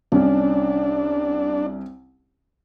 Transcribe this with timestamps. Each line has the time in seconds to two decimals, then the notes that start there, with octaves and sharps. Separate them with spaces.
0.12 C2 C#4 D4